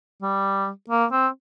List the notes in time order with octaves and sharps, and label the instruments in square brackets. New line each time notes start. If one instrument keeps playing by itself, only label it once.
[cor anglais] G3
A#3
C4